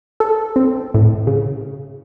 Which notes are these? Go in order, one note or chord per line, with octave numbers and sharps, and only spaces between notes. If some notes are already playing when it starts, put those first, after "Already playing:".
A4
C4
A2
C#3